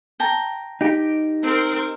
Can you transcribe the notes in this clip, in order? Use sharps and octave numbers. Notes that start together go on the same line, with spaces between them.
G5 A5 A#5
D#4 G4
C4 A#4